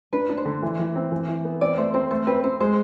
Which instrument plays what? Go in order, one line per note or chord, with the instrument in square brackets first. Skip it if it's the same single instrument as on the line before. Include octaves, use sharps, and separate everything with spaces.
[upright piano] D4 [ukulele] B4
[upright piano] D4
[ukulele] C5
[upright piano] D3
E3
E3
C4
E3
E3
B3
[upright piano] C4 [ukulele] D5
[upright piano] A3 [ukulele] C5
[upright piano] C4 [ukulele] C5
[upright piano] A3 [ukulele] C5
[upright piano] C4 [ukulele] B4
[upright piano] C4 [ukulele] C5
[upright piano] G#3 [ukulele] C5